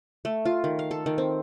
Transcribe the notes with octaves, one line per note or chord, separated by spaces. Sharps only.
A3
F4
D#3
F5
A4
D#3
C4